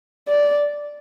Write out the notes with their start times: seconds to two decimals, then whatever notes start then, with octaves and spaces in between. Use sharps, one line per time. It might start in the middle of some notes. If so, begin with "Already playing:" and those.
0.28 D5